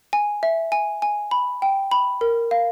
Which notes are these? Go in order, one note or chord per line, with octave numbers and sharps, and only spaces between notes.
G#5
E5
G#5
G#5
B5
G5
B5
A#4
F5